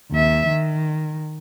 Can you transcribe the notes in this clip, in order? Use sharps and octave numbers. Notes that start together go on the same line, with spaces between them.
D#2 E5
D#3